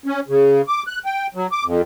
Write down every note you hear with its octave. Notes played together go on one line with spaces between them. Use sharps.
C#4
C#3
D6
F#6
G5
F#3
D6
F2